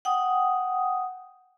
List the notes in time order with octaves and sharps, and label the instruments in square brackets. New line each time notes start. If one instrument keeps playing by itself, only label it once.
[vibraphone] F#5 G5 D#6